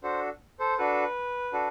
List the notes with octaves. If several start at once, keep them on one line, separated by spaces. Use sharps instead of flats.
D4 F#4 A4 C5
A4 C5
D4 F#4 A4 B4
D4 F#4 A4